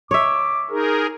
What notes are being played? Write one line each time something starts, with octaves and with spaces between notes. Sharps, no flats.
C#5 E5 D6
D#4 G#4 A#4